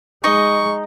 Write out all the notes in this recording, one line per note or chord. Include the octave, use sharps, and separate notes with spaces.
G#3 D#4 D#5 C#6